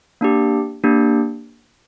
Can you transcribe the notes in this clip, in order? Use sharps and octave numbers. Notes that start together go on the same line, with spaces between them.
A#3 D4 G4
A#3 D4 G4